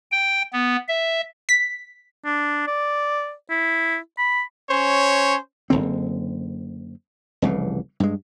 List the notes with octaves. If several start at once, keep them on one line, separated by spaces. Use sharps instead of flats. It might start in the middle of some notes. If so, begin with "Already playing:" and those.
G5
B3
E5
B6
D4
D5
E4
B5
C#4 C5 C#5
F#1 B1 D3 C4
F1 C2 C#3 E3
G2 G#3